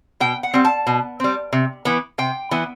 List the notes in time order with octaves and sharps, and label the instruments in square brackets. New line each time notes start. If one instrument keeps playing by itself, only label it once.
[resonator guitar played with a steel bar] B2 G5
F#5
G3 C4
A5
B2
G3 C4
C3
E3 B3
C3 G5
E3 B3